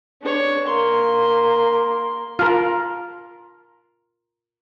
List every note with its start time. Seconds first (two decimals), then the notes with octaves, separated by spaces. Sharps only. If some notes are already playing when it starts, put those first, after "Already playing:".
0.21 D4 C#5
0.68 A#3 C6
2.39 F4 A#4 A5 F6